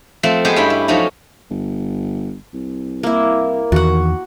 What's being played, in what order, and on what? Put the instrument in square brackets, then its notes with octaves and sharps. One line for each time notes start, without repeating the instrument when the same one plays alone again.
[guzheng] F3 A3 C4
G#3 B3 G4 G#4 C5
G2 C#4 E4 G5 B5
E4
F3 F#3 A3 C#4 D#4
[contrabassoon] G1
C2
[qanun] A#3 E4 [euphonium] A#4
[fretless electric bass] E2 D#3 [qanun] F#4 F#5